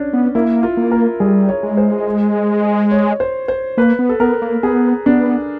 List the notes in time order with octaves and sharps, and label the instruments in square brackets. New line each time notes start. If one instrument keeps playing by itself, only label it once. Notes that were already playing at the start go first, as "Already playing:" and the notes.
Already playing: [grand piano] C#4 D4
[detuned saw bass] B3
[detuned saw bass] A#3 [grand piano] E4
[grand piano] F4
[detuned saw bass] A#3
[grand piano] A#4
[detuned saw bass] G3 [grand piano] G#4
[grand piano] C#5
[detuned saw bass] G#3
[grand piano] C5
C#5
C5
C5
[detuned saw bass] A#3 [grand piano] B4
[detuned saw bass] B3
[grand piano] A4
[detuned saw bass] B3 [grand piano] A#4
[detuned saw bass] A#3
[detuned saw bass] B3 [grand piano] G#4
[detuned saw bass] B3 [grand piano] D4